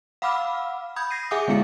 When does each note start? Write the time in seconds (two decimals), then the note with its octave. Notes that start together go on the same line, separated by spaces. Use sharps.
0.22 F5 F#5 B5 D6 E6 F6
0.96 B5 D#6 G6 G#6
1.11 A#6 C7 D#7
1.31 G#4 E5 F#5 G#5 D6 D#6
1.48 D3 G#3 B3 E4 F5 C#7